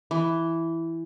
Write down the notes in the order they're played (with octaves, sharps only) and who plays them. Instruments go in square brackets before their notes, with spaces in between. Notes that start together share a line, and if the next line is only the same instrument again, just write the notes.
[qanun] E3